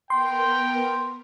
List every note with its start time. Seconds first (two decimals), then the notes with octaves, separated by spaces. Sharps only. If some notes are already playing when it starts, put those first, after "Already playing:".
0.10 B3 A#4 G5 C6